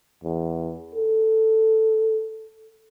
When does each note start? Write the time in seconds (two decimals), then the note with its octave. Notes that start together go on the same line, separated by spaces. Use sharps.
0.24 E2
0.95 A4